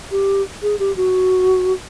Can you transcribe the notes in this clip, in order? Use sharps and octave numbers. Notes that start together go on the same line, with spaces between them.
G4
G#4
G4
F#4